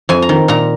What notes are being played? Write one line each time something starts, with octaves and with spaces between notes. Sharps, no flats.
F2 G#5
A#5
D#3
A#2 A#5